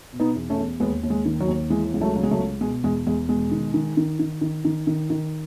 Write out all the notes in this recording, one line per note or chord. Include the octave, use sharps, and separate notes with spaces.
B2
B3 D#4
E2
A3 C#4
E2
D#2 G#3 B3
D#2
G#3
D#3
F#3
D#2
E3 G#3
C#2
F#3 A3
C#3 F#3
G#3
F#3 A3
C#2
B2 G#3
E2 G#3
E2 G#3
B2 G#3
D#3
D#3
D#3
D#3
D#3
D#3
D#3
D#3